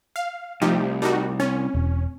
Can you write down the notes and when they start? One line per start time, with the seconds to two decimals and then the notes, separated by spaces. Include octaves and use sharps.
0.16 F5
0.62 C2 F3 A3 D#4 G4
1.02 G3 D#4 F#4 A#4 A5 D6
1.40 C4 C#4
1.75 E1